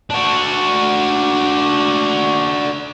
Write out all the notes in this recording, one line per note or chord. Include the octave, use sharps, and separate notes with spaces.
D4 F#4